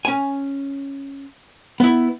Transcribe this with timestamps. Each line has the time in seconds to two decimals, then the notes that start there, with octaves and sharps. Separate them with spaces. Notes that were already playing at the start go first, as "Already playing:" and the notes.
0.05 C#4 G#5
1.80 B3 E4